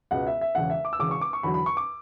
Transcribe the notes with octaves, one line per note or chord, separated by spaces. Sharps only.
C#2 B2 G#3 B3 F#5
E5
E5
E1 E2 C#3 F#5
E5
D6
E6
E1 E2 C#3 D6
C#6
D6
C#6
E2 D3 F#3 B5
B5
C#6
D6